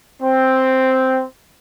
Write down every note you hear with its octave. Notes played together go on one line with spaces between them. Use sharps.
C4